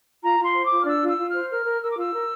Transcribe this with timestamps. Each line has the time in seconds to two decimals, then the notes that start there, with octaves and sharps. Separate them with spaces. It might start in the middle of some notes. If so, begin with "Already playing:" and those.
0.23 F4 A#5
0.39 F4 C6
0.55 C5
0.65 D6
0.70 F4
0.80 F6
0.86 D4 E6
1.02 F4
1.07 E6
1.18 F4
1.28 F6
1.34 C5
1.50 A#4 F6
1.65 A#4
1.81 A#4 E6
1.89 D6
1.97 F4 E6
2.13 A#4